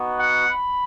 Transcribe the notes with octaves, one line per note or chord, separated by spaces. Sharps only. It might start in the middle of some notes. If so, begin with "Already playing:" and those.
Already playing: B3 D#4 F#4
F#5
B5